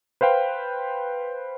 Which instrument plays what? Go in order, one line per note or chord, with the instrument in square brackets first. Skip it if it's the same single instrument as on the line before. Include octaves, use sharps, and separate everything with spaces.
[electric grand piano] B4 C5 F5 G5